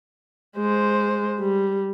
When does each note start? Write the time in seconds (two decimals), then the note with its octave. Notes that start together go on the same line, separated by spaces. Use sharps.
0.57 G#3 C5
1.39 G3